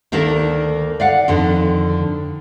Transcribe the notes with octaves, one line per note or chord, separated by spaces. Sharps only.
D2 D#3 A#3 D4 A4 A#4
D5 F5 F#5
F2 D3 D#3